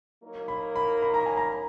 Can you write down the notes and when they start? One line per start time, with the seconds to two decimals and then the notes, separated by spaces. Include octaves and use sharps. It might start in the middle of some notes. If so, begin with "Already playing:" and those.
0.21 F#3 A#3 D#4 A#4 C#5
0.48 B5
0.76 B5
1.02 B5
1.14 A#5
1.26 G#5
1.37 A#5